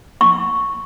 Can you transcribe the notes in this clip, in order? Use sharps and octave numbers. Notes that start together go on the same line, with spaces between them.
C#6